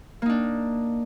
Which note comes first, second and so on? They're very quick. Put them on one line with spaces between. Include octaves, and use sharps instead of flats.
A#3 D#4 D4